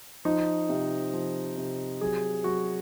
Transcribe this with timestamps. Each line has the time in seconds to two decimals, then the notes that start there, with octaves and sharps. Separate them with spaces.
0.25 F3 D#4
0.69 C3
1.14 F3
1.57 C3
2.01 F#3 G#4
2.44 F#3 F#4